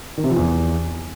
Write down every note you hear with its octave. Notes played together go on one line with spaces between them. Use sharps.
D#3
C3
F3
E2